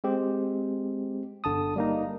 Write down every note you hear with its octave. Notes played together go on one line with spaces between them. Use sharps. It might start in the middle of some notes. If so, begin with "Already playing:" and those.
G#3 C4 G4
G1 D3 A5 D#6
G3 A#3 D#4